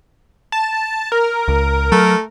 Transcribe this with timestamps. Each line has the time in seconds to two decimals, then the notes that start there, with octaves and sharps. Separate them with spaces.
0.52 A5
1.12 A#4
1.48 C#2
1.92 F#3 A3